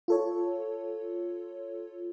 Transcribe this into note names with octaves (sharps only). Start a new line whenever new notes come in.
F4 A4 C#5